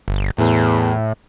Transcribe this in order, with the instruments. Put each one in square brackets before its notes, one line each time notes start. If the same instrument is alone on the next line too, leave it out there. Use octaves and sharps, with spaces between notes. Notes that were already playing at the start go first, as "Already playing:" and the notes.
[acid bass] G1
[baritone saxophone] E2 [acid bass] A2